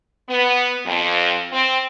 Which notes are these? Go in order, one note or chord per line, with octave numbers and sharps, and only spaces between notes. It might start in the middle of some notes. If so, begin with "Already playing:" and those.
B3
F2
C4